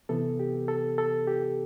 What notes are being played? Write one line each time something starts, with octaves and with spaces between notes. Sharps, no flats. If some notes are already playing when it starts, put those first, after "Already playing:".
C3 E3 B3 A4
G4
A4
A4
G4